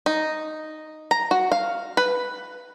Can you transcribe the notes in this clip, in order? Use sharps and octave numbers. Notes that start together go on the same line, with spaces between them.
D#4
A#5
F#4
F5
B4